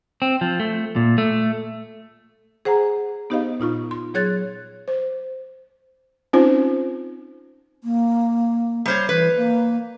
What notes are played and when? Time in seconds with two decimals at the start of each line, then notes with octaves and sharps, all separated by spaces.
0.22 C4
0.41 F3
0.60 A3
0.96 A#2
1.18 A3
2.65 G#4 C5 F#5 G#5 A#5
3.30 B3 D#4 G4 C5 D#5 F5
3.60 A#2 D#4 F4 C#6
3.91 C6
4.14 F#3 G#4 C#5 F#6 G#6 A6
4.88 C5
6.33 C4 C#4 D#4 F4 C5
7.84 A#3
8.86 G3 C5 C#5
9.09 E3 B4
9.37 A#3